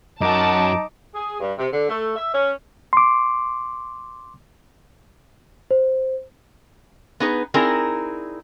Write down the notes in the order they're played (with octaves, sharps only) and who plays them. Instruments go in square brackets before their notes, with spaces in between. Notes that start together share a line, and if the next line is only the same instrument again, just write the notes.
[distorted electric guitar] F#2 F#4 [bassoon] D#4 [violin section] A5 [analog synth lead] D6
[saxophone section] G#4
G2
C3
D3
A3
E5
C#4
[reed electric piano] C6 D6
[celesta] C5
[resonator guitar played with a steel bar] B3 D#4 G#4 B4
C4 D#4 E4 G#4 A#4 D5